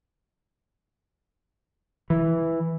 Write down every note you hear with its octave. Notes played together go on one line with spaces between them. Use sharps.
E3